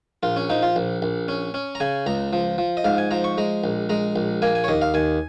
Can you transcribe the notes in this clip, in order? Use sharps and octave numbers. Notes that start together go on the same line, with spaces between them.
A#1 F4
C#4
F3 D#4
F4
A#1
A#1
C#4
C#4
A#5
C#3 G#5
C#2 A#5
F3
F3
D#5
G#2 F5
G#5
F3 A#5
C#6
G#3 A#5
A#1
G#3 A#5
A#1
A#3 G#5
G#5
C#5
D#2 D#5
F5
D#2 G#5